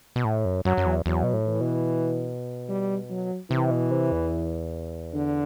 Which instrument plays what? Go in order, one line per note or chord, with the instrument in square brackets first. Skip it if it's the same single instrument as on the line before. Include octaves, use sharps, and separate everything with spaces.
[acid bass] B2
A2
F#2
[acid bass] F#2 [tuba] F#3
[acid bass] F#2
E2
[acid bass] E2 [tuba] F#3
[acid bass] B2
A2
[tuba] E3
[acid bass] B2
[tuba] G3
F#3
[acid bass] C3 [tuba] E3
[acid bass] B2
C3
E2
[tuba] D3